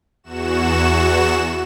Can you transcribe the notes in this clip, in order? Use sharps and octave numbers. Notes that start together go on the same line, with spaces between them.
E2 F#4 E7